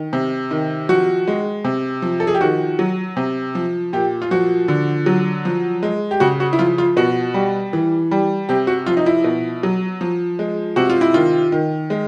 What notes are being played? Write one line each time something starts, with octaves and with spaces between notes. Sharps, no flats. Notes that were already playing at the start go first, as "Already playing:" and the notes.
Already playing: D#3
C3
D#3
F3 F#4
G#3
C3
F3
A4
G#4
G4
D#3 F#4
F#3
C3
F3
A#2 G4
F4
F3 F#4
D3
F#3
F3
G#3
G4
C#3 F#4
F#4
E4
F3 F4
F4
B2 F#4
G3
E3
G3
C3 G4
F#4
F3 F4
D#4
E4
B2
F#3
F3
G#3
C3 F#4
F4
E4
D#3 F4
D#3
G#3